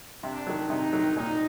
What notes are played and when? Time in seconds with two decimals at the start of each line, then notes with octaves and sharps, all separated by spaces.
0.23 C3 D4
0.47 D#3 F#3
0.70 C3 D#4
0.93 D#3 F#3
1.17 A#2 D#4